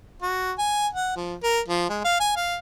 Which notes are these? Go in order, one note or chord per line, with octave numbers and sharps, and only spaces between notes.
F#4
G#5
F#5
F3
A#4
F3
G#3
F5
G#5
F5